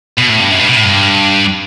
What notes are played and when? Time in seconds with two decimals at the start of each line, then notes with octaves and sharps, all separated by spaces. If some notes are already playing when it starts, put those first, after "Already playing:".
0.18 B2
0.30 A2
0.41 G2
0.52 F#2
0.59 G2
0.69 B2
0.76 A2
0.84 G2